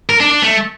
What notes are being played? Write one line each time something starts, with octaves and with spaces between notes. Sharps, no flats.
A#4
D4
D4
A3